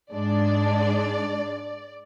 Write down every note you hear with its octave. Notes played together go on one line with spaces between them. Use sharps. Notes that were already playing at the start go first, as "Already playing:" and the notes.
G#2 G#3 D4 D5